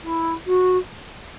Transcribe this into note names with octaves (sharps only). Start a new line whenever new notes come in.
E4
F#4